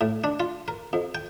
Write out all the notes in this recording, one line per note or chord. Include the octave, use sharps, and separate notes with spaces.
A2
D4
F4
A#4
F2
G5